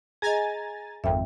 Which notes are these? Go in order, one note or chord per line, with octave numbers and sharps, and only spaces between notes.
G#4 D#5 G#5 A#5 A6
G#1 F2 E5 G5